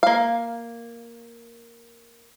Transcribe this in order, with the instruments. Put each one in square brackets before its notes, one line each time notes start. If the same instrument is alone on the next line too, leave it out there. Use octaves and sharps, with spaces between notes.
[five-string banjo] A#3 F5